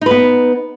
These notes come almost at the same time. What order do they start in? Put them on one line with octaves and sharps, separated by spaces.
D#4 B4 B3